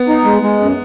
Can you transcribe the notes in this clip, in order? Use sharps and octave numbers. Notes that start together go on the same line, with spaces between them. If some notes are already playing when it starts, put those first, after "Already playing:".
Already playing: B3
D#4
G#3
G#3
F#2